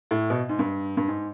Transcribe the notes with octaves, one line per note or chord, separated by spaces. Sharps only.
A2
B2
G#2
G2
G2
G#2